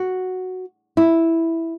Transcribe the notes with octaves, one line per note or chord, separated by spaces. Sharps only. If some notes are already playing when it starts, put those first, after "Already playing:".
Already playing: F#4
E4